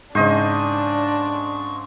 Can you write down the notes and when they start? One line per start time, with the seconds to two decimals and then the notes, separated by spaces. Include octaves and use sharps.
0.15 G#2 C#3 D4 C5 D#5 C#6